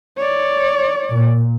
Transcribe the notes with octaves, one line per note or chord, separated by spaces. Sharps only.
C#5 D5
A#2